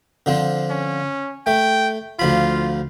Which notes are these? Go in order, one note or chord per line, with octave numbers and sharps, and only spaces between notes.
D3 F3 C4
C#4
A3 G5
D2 F3 F4 B5